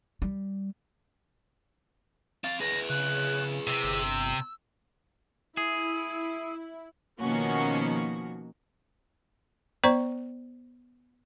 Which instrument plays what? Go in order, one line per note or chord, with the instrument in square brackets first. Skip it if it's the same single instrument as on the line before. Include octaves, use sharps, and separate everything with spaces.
[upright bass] G3
[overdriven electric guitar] C4 F5 [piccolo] A6
[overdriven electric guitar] G#4 B4 [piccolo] A#6
[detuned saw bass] C#3 [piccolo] F#6
[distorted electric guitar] C3 [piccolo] E6
[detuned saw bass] G1
[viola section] E4 [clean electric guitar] G#4
[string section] B2 D#3 F3 A#3 C#4 F#4
[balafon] B3 C5 D5 A#5 C#6